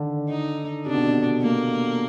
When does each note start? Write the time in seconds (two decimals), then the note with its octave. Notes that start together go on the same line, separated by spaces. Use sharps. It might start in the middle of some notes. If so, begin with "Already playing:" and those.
Already playing: D3 D#3
0.29 D#4
0.86 C3 D4
0.94 B2
1.01 C3
1.42 A#3